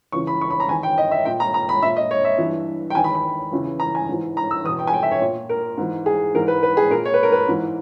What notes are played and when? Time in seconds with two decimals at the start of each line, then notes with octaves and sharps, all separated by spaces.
0.12 E2 C#3 E3 C#6
0.27 B5
0.41 C#6
0.50 B5
0.60 A#5
0.69 E2 D#3 G#5
0.83 G5
0.98 D#5
1.11 E5
1.25 A#2 G5
1.40 A#5
1.54 A#5
1.69 B5
1.82 A#2 E5
1.97 D#5
2.11 C#5
2.25 E5
2.38 G2 E3
2.90 G5
2.95 E2 D#3 G#5
3.04 B5
3.15 B5
3.52 E2 C#3 E3
3.80 A#5
3.95 G#5
4.09 G#2 E3
4.37 A#5
4.51 E6
4.64 E2 D#6
4.69 B2
4.79 G5
4.87 G#5
4.93 G5
5.03 E5
5.12 C#5
5.22 A#2
5.49 A#4
5.77 G#2 E3
6.06 G#4
6.34 G#2 E3 A#4
6.48 B4
6.63 B4
6.77 G#4
6.90 A#2 A#4
7.05 C#5
7.14 B4
7.23 A#4
7.32 B4
7.48 G#2 E3